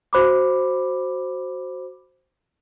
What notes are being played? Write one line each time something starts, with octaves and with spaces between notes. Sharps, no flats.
F#4 C5 B5 D6